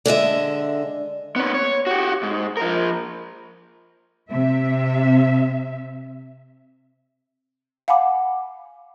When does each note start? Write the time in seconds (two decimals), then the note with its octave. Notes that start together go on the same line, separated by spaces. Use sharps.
0.06 D3 G#3 D#5 E5
1.36 B3 C#4
1.54 C#5
1.87 F#4 G4
2.23 G#2
2.57 F3 A#4
4.30 C3 E5
7.88 F5 F#5 G#5 B5 D6